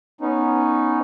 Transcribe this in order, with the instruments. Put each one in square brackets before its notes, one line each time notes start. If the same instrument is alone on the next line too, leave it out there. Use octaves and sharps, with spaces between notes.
[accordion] B3 C#4 D#4